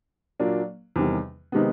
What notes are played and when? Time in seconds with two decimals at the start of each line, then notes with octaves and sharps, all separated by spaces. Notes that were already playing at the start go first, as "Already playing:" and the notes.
0.40 A#2 F#3 A#3 D4
0.96 E2 C3 D#3 G3
1.52 C3 D#3 G#3 B3